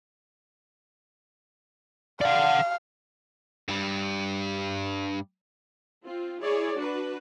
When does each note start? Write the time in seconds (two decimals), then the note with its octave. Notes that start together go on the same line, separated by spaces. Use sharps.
2.21 D5 F5 F#5
3.68 G2 G3
6.05 C4 F4
6.41 E4 G#4 C#5 D5
6.77 D4 F#4 B4